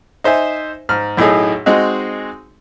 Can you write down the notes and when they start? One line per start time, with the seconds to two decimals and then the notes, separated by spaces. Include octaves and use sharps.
0.24 D#4 C5 E5 G#5
0.89 G#2 F6
1.17 B1 A2 A3 D#4 G#4
1.66 G#3 C4 D#4 F#4